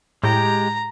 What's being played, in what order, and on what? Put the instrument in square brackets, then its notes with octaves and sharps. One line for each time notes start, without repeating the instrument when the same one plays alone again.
[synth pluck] A2 [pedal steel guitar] G#3 G4 G5 [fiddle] A#5